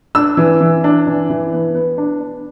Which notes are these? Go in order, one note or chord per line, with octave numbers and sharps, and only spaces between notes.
D4 E6
E3
E3
D4
E3
E3
B3
B3
D4